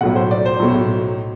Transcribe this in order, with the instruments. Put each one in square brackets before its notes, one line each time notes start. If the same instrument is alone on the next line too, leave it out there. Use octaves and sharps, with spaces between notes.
[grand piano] B1 A2 F#3 F#5
C5
D5
C5
B1 A2 F#3